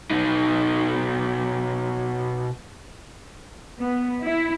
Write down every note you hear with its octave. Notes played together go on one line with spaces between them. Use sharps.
B2 D#4
B3
E4